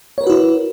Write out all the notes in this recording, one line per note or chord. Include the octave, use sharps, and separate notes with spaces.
E4 F#4 A#4 B4 C#5